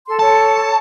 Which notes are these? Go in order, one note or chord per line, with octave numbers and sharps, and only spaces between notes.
A4 C6
A4 C#5 A5